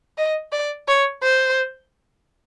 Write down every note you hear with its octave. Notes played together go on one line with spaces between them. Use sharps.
D#5
D5
C#5
C5